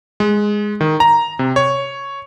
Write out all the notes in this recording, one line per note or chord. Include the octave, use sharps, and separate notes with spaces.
G#3
D#3
A#5
C3
C#5